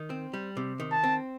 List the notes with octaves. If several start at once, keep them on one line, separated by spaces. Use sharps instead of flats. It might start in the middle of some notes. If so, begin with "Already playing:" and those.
Already playing: D#3
C4
G3
C3
D#3
A5
C4